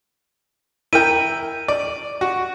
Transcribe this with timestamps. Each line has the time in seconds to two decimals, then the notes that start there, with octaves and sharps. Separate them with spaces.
0.93 E4 A#4 G5 D#7
1.68 D5
2.21 F#4